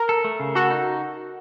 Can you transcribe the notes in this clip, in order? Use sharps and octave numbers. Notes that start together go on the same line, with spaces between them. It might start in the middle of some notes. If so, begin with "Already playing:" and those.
Already playing: A#4
A4
A3
C#3
F#4 A4
D#4